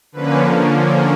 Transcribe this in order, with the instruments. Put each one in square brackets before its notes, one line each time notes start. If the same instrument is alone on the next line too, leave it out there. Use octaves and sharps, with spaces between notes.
[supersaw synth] D3 F3 A#3 C#4 B4